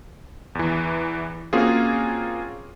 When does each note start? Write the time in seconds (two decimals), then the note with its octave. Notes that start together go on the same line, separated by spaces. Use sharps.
0.55 E2 E3
1.53 A#3 C4 C#4 F4 F#4 G#4